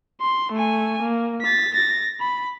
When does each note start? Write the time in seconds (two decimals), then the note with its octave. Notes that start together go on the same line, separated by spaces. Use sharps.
0.21 C6
0.52 A3 G#5
1.02 A#3
1.42 A6 B6
1.74 A6 A#6
2.20 B5